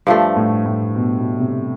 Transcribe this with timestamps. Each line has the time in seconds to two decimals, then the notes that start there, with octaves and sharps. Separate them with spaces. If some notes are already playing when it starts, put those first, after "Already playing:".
0.07 G2 F3 A3
0.36 A2
0.66 A2
0.95 B2
1.18 B2
1.40 C3